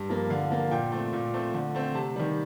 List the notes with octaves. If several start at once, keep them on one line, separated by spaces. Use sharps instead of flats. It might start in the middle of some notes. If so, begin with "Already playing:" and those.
Already playing: G2
F3 A#3
D3 F5
F3 A#3
A#2 G5
A3 C4
A#2
A3 C4
D3
A3 C4
C3 A5
D#3 G3